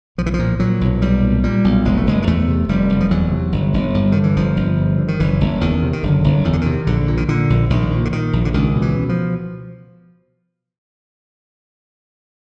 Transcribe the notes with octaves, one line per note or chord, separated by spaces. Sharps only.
B1 F3
E3
F3
A#2
A#2 F#3
B1
B1 G3
A#2
A#2 G3
B1
F1 G#3
A3
F1 G#3
G#3
E2 A3
C3
F1 G3
F1
F3
E2 F#3
C3
G1
G1
G2
D3 D#3
E3
G1 F3
G1
G2
D3
D#3
F#1 E3
F#1
E2 D#3
C3
D#3
F#1 D3
F#1
E2 D#3
D3
C3 D#3
A#1 D3
A#2
D#3
A#2 D3
A#1
A#1 D#3
A#2
D3
A#2 D#3
A#1
D3
C#2 D#3
B2
E3
B2
F3